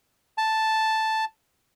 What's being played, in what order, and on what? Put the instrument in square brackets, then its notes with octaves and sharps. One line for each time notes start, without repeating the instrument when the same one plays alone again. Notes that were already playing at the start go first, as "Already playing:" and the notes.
[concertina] A5